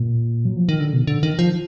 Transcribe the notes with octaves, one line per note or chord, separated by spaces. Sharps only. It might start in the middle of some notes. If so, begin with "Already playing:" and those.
Already playing: A#2
F#3
F3
D#3
D3
B2
D3
D#3
F3